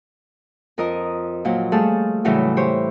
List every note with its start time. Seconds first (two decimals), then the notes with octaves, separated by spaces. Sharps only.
0.78 F2 A#4 D#5 D#6
1.45 A#2 F3 F#3
1.72 G3 A3 G#4 A4 F5 A5
2.24 A2 C#3 E3 F#3 G3
2.57 G4 C5 C#5